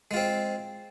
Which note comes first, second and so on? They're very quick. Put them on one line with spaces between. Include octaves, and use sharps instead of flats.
G#3 F4 C4